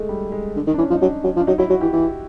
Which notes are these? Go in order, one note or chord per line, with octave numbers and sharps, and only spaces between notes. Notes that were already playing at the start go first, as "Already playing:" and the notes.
Already playing: G#3 A3
G3
G#3
D3
D#3
D4
E3 C#4
F3
D#4
F#3 D4
F#3
F3
D4
F#3 D#4
F#3 E4
F#3 F#4
E3 G4
E3